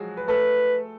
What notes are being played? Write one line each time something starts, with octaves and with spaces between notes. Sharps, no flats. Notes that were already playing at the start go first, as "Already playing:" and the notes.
Already playing: F3 F#3 G#3 F#4 G#4
B4
A3 A4 B4